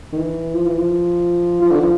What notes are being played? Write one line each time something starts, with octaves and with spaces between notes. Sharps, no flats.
D#3
E3
F3
E3
F3
F3
D3
F3